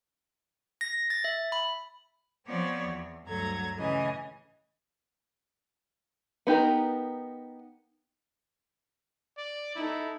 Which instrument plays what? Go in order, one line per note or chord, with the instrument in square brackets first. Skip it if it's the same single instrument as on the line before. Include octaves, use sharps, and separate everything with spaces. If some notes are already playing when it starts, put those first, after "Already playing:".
[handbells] A#6
A6
E5
B5
[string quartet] F3 B3 C4 C#5 D5
E2
D2 G2 F#3 A4 A#5 G#6
A2 C#3 E3 D#5 G#5
[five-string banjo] B3 D#4 G4 A#4
[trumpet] D5
[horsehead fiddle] D#4 A4 [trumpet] E4